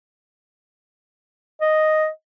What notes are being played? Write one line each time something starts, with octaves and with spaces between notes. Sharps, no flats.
D#5